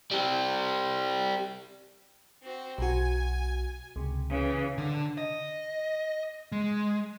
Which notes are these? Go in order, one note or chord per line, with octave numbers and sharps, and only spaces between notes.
G3 C4
C4 F#4
B1 F#4 G#5
C#2 C3
C#3 E3
D3
D#5
G#3